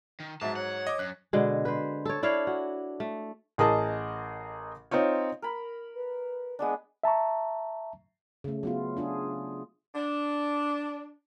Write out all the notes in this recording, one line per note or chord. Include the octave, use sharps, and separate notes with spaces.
D#3
G#2 F#3 E5 A5
C#5 F#5
D#5 D6
F#2 F#6
B2 D3 G#3
B4 C5
A4 C#5
D4 E4 C#5 F5
F#4
A3
A1 G#4 A#4 D#5 A5
C4 D#4 F4 C#5
A#4 B5
B4
G#3 B3 D4
E5 A5 A#5 C#6
C#3 A3
F#3 B3 F4
D4 F4 G#4
D4